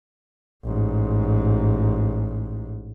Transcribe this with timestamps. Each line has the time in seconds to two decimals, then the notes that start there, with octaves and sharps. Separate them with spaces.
0.64 A1 G#2